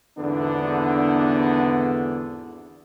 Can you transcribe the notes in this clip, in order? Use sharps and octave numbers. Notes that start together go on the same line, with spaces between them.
G#1 E2 D3 B3 D4